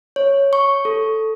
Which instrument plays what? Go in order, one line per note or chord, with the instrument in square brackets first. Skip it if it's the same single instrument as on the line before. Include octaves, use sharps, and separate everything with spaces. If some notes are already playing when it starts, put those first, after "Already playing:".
[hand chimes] C#5
C#6
A4